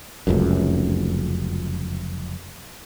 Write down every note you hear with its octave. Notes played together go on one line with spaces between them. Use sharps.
F1 C#2 F#2